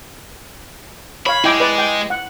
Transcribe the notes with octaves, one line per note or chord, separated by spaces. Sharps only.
C#5 F5 B5
G#3 E4 G5 D6
B4 D5
G5 D6
F#5